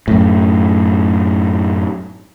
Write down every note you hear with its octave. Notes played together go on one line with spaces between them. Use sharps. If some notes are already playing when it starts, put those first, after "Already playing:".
F#2 A2